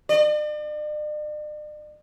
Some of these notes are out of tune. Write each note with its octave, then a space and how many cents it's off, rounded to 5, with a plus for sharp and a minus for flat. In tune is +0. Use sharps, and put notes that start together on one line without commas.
D5 +45